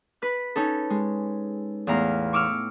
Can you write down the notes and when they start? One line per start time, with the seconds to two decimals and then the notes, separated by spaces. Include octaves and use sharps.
0.22 B4 F#6
0.56 C#4 D#4 A4
0.90 G#3
1.87 E2 A2 F5 A#5
2.33 C#6 D6 E6 F6